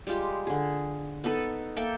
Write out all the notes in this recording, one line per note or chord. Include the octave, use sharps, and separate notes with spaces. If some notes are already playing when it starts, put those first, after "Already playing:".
G3 G#3 F4 G4
D3 G#4
B3 D#4 A4 B4
A#3 A4 E5 G5